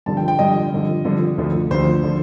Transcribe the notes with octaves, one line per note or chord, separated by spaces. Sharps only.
G2 D3 F3 A5
G5
G5
G2 D3 F3 D#5
G2 D3 F3
G2 D3 F3
D2 D3 F3
D2 D3 F3 C5
D3 F3